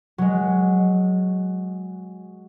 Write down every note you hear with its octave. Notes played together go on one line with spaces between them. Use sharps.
F#3 G#3